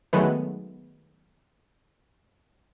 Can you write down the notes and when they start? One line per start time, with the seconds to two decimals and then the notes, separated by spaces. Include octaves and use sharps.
0.13 D#3 F#3 G#3 A3 B3